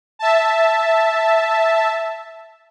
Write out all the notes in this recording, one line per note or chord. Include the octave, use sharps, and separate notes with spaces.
E5 A5